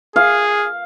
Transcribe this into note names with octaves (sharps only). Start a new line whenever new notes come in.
G#4 F5